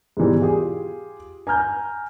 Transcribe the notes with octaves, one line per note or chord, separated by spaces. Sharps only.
G#2 B2 E3 G3
F4 G4 G#4
G#5 A#5 F6 G6